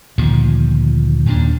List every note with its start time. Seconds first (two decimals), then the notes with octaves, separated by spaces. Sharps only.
0.18 D2 A#2 D#3 F3
1.26 D#2 A#2 D#3 D4